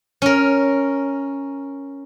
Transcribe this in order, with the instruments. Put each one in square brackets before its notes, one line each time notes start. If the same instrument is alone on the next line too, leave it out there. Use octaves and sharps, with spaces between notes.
[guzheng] C#4 A#4